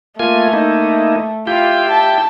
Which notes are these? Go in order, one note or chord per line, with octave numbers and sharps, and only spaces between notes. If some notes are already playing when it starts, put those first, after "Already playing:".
A3 A#3 F4 G#5
A#3 D#4 E4
E4 F4 G4 G5
A5